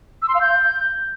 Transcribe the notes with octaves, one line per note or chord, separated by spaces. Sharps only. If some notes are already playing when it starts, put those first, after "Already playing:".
E6
C6
F5
G6